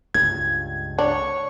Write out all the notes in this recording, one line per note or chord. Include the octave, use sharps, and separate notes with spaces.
C#2 G2 G#6
D4 C#5